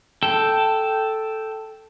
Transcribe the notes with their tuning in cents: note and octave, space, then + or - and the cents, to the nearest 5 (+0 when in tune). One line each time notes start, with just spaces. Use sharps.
A4 +0 G5 -5